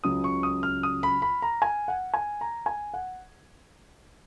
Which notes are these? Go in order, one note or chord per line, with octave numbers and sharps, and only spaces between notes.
C#2 C#3 F#3 D#6
C#6
D#6
F6
D#6
B5
B5
A#5
G#5
F#5
G#5
A#5
G#5
F#5